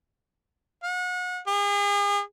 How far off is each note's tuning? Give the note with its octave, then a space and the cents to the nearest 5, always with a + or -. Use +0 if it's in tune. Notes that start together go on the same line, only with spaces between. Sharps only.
F#5 -35
G#4 -40